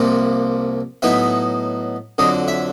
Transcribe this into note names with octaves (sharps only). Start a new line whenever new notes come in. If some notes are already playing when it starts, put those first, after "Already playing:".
Already playing: C2 C3 F3 A#3
A2 F#3 B3 D#4 E5
F2 D3 F#3 D#5
E5